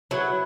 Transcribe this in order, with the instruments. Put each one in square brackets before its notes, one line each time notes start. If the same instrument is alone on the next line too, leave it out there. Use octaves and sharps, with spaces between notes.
[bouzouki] F#3 [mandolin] E4 B4 F#5